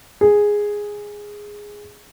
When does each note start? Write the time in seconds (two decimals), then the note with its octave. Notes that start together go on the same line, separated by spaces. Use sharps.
0.21 G#4